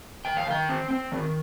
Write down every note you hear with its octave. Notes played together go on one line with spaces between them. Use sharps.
D#3 G5
F5
D#3 G5
C4
C4
D#3